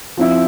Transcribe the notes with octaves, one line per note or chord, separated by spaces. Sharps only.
F3 C4 E4